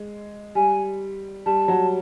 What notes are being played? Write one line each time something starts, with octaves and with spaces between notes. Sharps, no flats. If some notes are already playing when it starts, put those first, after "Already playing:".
Already playing: G#3
G3 G#5
G3 A5
F#3